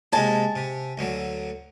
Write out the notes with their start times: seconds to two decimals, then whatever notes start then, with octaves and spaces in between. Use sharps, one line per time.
0.12 C3 G#3 A#3 G#5 A5
0.56 C3
0.98 D2 D3 F#3